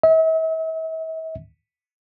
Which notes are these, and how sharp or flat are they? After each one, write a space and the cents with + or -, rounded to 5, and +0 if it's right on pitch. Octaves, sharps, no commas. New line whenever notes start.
E5 -40